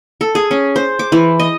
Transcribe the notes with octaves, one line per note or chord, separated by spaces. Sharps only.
A4
G#4
C#4
C5
D6
E3
D#5